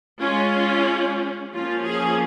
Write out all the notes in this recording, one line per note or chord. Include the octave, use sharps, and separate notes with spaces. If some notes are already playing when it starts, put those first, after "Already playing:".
G#3 C#4 F4
F3 A#3 C#4 F4
G#4